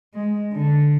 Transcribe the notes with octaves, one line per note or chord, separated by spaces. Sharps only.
G#3
D3